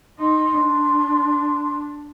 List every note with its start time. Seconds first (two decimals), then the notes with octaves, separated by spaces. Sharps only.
0.19 D#4 C6
0.60 D4